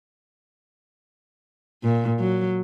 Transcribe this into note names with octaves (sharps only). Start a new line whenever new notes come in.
A#2
F#3